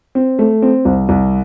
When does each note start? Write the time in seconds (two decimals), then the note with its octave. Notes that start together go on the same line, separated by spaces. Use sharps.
0.15 C4
0.39 A3
0.62 C4
0.85 C2
1.09 C2